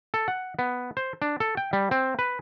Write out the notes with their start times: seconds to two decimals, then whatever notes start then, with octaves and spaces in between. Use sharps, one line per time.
0.14 A4
0.28 F#5
0.59 B3
0.97 C5
1.22 D4
1.40 A4
1.57 G5
1.73 G3
1.91 C4
2.19 B4